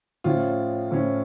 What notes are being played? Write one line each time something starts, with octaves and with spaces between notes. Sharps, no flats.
A2 F3 C#4 F4
A2 F3 C#4